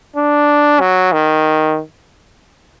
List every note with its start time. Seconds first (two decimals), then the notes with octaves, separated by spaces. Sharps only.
0.16 D4
0.80 F#3
1.12 D#3